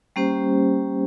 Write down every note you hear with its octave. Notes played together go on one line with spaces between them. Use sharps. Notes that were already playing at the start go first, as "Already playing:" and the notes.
G3 A#3 C#4 G4 C5